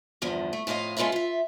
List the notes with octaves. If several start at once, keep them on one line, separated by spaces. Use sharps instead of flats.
E2 G2 D3 F3
A3
F2 A2 F4 D#5 F5
G#3 C#4 F4 A4 B4 E5
F4 E5